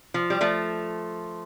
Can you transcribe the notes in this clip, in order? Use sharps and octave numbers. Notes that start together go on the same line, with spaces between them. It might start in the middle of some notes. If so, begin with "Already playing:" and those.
F3
G3
F3 A3